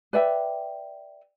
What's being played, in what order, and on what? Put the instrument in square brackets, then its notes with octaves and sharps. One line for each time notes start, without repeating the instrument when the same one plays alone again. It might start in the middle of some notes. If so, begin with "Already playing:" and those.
[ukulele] B4 D5 E5 G5